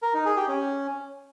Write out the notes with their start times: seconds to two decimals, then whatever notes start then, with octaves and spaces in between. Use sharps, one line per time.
0.02 A#4
0.14 D#4
0.25 G#4
0.37 G4
0.48 C#4